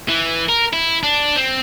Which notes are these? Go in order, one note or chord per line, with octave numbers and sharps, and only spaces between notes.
E3
A#4
E4
D4
C4